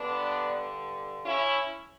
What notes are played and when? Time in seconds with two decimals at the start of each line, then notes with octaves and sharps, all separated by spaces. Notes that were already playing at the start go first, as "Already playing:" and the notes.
Already playing: G2 D3 B3 D4
1.26 C#4 E4